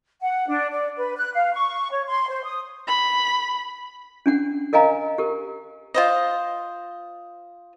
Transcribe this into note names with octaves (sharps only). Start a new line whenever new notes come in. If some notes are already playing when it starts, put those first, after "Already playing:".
F#5
D4
D5
B4
F#6
F5
C#6
C#5
C6
C5
D#6
B5
C#4 D4 F#5
A#4 D#5 F5 G#5 A#5
G4 A#4
F4 C5 D#5